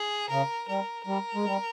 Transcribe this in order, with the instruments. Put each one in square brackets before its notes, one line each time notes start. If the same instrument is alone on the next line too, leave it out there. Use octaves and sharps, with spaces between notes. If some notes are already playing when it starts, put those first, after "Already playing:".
Already playing: [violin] G#4
[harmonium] C#3 [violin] A#4
[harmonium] G3 [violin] A#4
[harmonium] G3 [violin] A#4
[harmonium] G#3
G3